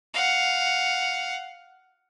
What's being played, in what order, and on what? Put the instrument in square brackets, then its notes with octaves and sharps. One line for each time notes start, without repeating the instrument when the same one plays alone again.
[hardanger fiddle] F5 F#5